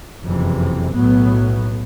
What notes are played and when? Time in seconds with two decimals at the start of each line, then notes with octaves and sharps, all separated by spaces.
0.23 F#1 F2 C3 E3
0.94 B1 A2 F#3 B3